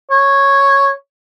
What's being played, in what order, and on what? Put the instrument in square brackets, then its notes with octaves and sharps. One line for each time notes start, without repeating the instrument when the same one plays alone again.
[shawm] C#5